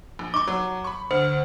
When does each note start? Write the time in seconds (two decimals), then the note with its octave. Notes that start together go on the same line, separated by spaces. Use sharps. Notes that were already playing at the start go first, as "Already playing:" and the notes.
0.19 A#1
0.34 D#4 C#6 D6
0.48 F#3
0.84 B5 C#6
1.11 D2 C5